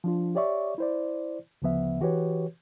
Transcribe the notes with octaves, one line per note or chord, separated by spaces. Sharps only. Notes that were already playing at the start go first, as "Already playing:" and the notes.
F3 D4 F4
G4 C#5 D5 E5 C#6
E4 C5 D5
D2 C#3 F3 B3 E5
E3 F#4 G4 B4 C#5